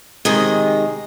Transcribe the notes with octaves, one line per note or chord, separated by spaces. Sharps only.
C3 D#3 G#3 D#5